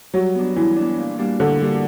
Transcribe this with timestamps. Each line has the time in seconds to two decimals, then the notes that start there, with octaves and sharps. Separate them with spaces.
0.14 F#3 G3
0.35 B3 D4
0.56 E3 G3
0.76 B3 D4
0.98 A#2
1.18 G3 A#3 D4 F#4
1.39 A#2 D3
1.60 G3 A#3 D4 F#4